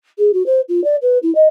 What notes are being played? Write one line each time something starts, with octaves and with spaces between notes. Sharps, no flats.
G#4
F#4
C5
F4
D5
B4
E4
D#5